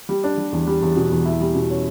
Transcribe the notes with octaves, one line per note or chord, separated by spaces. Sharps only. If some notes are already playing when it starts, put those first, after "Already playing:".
G3
D4
G3
E2
G3
E2
B2
E2
E4
G3
B2
C#4